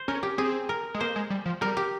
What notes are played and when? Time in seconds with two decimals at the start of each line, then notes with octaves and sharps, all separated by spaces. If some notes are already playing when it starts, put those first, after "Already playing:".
Already playing: C5
0.08 C#4 A#4
0.23 G4
0.38 C4 G#4
0.69 A#4
0.94 G#3
1.01 A#3 C5
1.16 G#3
1.30 G3
1.46 F3
1.61 G3 A#4
1.77 G4